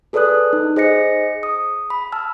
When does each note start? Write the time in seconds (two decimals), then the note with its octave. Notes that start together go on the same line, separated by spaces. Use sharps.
0.13 G#4 A4 B4 D5 D#6 F#6
0.53 D#4
0.76 G#4 C5 D#5 A#6 C#7
1.43 D#6
1.90 B5
2.12 A5 E6 F6